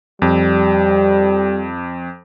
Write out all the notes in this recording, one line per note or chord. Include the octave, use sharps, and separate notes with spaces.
F2 G3